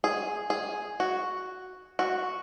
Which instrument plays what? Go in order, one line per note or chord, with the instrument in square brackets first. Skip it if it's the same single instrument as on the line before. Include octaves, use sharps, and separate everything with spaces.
[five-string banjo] G#4
G#4
F#4
F#4